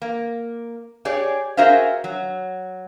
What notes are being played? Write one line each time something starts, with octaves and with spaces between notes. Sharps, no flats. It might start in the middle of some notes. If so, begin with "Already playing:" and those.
A#3
G4 G#4 C#5 D5
F#4 G#4 A#4 C5 E5 F5
F#3